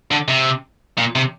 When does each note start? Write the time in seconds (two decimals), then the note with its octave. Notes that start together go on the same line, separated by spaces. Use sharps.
0.11 D3
0.28 C3
0.98 A#2
1.15 C3